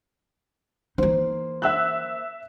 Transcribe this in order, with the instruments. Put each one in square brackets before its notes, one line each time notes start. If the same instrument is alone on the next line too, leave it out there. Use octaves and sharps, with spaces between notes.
[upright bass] E3 D#4 [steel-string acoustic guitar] A#3 C5
[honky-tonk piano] E5 E6 F#6